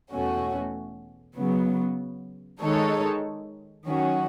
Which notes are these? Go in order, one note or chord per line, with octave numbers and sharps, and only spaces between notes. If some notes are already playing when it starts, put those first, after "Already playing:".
E2 B2 A3 C#4 F#4
C#3 F#3 B3
D#3 G#3 D#4 A4 C#5
D#3 F#3 C#4 F#4